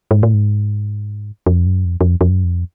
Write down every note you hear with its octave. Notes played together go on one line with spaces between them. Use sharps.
G#2
A2
G#2
F2
F#2
F2
F2
F2
F#2
F2